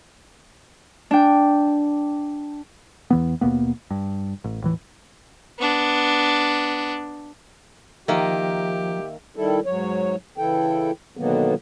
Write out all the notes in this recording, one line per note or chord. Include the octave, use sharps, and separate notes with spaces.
D4 G5
E2 E3 B3
D#2 B2 A#3 B3
G2
A1
D#1 A2 E3
B3 D4
D#3 F3 A#3 G4 A#4 E5
D#3 G3 E4 A4
G#2 F#3 C#5
C#3 E3 E4 A4 G5
B2 D3 D#3 F#3 A#3 B3